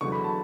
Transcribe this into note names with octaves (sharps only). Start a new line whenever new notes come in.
E2 D3 F#3 C#6
B5
A5